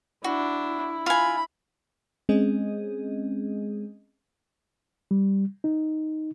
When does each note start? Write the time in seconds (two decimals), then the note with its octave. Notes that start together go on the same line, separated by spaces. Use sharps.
0.24 D4 E4 F#4
1.06 F4 G#5 B5
2.29 G#3 C4 C#4 G#4 D#5
5.11 G3
5.64 D#4